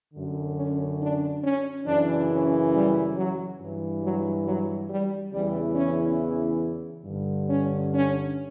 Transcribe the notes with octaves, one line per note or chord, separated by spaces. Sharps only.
F#2 D3
C#4
D4
C#4
F#2 C#3 E3 D4
C#4
G3
F#3
G2 E3
F#3
F#3
G3
E2 C#3 E3 G3
C#4
G2 D3
C#4
C#4